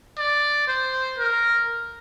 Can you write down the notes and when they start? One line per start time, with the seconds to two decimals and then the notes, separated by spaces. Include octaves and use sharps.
0.18 D5
0.68 C5
1.18 A#4